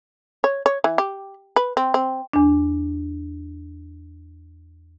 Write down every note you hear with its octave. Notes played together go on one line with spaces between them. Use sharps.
C#5
C#5
E3
G4
B4
C4
C4
E2 D4